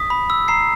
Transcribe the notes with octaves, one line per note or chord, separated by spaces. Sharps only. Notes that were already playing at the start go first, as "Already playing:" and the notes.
Already playing: D#6 B6
B5
E6
A#5 C7